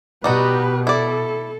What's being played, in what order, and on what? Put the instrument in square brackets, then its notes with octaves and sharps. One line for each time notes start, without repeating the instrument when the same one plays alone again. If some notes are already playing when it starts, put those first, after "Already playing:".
[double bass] B2 [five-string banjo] G3 D#4 F#4 [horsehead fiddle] G4 B4
[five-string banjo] E4 D5 [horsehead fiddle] A4